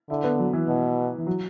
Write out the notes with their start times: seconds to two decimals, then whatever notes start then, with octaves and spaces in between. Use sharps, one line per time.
0.09 D3 E4
0.24 B3
0.39 F#3
0.53 E3
0.68 B2
1.18 E3
1.27 F#3